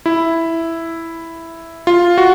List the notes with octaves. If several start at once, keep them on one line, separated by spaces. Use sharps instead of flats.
E4
F4
F#4